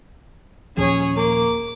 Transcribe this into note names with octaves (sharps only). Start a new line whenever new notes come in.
D#2 A#2 F3 C#4 G#4 C#5
A#3 D6